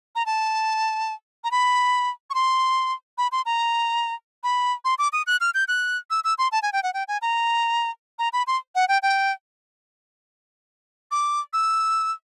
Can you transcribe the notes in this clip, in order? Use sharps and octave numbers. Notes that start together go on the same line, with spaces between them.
A#5
A5
A#5
B5
C#6
C6
B5
C6
A#5
B5
C6
D6
D#6
F#6
F6
G6
F#6
E6
E6
C6
A5
G#5
G5
F#5
G5
G#5
A#5
A#5
B5
C6
F#5
G5
G5
D6
E6